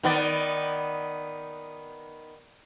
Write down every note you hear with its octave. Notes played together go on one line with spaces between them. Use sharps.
D#3 B3 D5